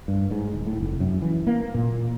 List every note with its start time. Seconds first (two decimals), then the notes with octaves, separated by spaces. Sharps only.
0.08 G2
0.31 G#2
0.55 D1
0.67 A2
0.80 F1
1.00 F#2
1.22 E3
1.47 A#3
1.74 A#2